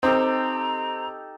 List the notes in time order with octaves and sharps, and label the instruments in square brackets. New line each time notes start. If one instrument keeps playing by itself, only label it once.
[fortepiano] C4 [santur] D#4 G4 A4 [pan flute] A#5